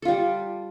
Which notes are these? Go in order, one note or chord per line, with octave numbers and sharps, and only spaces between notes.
G3 F4 A4